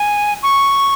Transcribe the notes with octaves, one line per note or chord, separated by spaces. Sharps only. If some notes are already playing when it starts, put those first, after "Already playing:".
Already playing: G#5
C#6